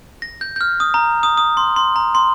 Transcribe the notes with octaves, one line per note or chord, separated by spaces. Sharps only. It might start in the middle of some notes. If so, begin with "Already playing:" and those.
A#6
G6
G6
F6
D#6
A#5
D#6
D#6
C6
C6
A#5
C6